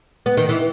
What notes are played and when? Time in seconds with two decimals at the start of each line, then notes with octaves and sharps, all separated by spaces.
0.26 B3
0.37 D#3
0.49 E3